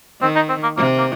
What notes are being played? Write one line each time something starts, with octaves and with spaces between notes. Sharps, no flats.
D#3 C4
D#4
C4
A#3
C3 A#3
A#3